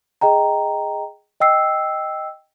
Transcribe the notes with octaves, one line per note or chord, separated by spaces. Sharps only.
G#4 D#5 G5 A#5
D#5 G5 E6 C7